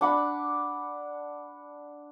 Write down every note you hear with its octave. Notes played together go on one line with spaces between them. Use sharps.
D4 F#5 B5